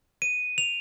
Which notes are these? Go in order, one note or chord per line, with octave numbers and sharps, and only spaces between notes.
D#7
F7